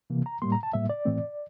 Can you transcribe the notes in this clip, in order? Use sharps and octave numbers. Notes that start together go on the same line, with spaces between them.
C3 E3 A#3
A#5
A2 G3 A#3 C6
A#5
A5
A2 G3 A#3 E5
D5
A2 E3 A3 C4